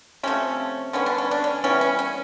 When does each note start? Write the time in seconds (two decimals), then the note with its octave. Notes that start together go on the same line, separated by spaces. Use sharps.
0.23 C3 F3 A3 C#4
0.93 D3 G3 B3 C#4
1.06 D4
1.18 C#4
1.31 D4
1.44 C#4
1.64 E3 G3 B3 C#4
1.81 C#4
1.99 C#4